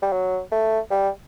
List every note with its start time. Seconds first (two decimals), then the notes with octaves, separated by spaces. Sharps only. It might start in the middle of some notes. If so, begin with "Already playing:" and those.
0.02 G3
0.12 F#3
0.52 A3
0.91 G3